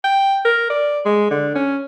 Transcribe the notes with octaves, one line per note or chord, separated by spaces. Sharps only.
G5
A#4
D5
G#3
D3
C#4